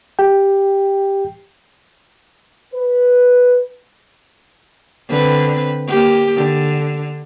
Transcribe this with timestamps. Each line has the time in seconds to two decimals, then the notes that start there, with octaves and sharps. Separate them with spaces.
0.19 G4 G5
2.74 B4
5.09 D3 C4 B4
5.88 A#3 G4
6.36 D3